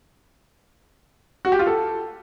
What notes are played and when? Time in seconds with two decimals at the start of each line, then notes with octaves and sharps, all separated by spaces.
1.45 F#4
1.52 G4
1.59 F4
1.67 A4